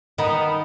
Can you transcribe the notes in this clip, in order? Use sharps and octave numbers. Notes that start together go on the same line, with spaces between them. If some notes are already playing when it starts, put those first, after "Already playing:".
D#3 B3 D#4